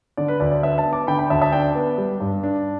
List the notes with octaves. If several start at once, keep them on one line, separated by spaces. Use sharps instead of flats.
D3 D5
B4
D2 D5
D5
D4 B4 E5
E5 A5
B3
A5 D6
D3 G5 B5
G5 B5
D2 E5 A5
E5 A5
D4 D5 G5
B3
G3
G2
D4